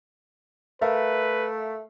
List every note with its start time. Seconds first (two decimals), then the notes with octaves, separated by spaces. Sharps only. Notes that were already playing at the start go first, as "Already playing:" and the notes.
0.82 A3 A#4 B4 E5 F5